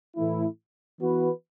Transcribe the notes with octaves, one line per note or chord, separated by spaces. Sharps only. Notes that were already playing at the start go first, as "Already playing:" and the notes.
A2 E3 A3 E4
E3 B3 F#4 B4